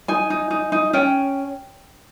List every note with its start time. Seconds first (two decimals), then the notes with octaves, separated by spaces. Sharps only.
0.08 D#4 G#5
0.30 D#4
0.51 D#4
0.72 D#4
0.93 C#4 G5